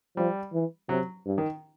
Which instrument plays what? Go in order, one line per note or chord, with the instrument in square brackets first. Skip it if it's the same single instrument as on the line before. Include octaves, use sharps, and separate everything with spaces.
[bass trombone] F3 [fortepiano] G3
[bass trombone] E3
[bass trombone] C3 [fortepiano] F#3
[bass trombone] G2
[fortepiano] D#3